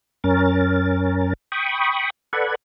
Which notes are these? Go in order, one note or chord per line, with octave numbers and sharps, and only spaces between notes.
F#2 C#4 A#4 A6
G5 B5 C#6 D#6
A4 B4 D5 F#5 B5 G#6